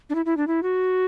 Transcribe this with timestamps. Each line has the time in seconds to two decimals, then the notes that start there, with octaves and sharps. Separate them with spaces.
0.10 D4
0.15 E4
0.25 E4
0.37 D4
0.47 E4
0.63 F#4